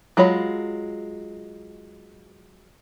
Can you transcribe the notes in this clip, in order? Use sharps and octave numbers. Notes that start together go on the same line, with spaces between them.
F#3 G#3 F4 C#5 B5